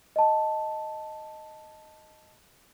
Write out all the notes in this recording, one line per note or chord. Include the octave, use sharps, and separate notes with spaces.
D#5 A5